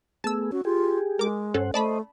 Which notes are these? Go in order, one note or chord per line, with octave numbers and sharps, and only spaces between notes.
A3 B3 G#4 A5 E6
C#4 F#4
F4 G4 G#4
G#3 A#4 D6
G2 C#4 A4 C5 F#5
A3 C5 D5 D#5 A5 B5